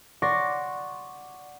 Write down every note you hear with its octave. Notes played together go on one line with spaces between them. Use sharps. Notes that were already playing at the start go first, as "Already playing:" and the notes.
D5 F#5 C6 C#6 A#6